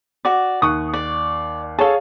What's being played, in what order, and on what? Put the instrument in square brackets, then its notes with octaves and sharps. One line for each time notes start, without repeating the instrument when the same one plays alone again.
[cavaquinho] F#4 D5
[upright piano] D#2 C#6 F#6 [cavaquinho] D#6
[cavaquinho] D5
[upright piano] G#4 C#5 F5 [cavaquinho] A4 A5